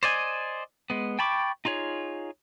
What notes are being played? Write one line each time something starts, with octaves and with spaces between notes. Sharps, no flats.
C5 D5 D#5 G#5
G#3 B3
G5 A5 B5 C#6 D6
D#4 F4 G#4 C#5